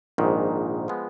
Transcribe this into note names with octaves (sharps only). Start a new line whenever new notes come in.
A#1 G#2 D#3
F3 G#3 B3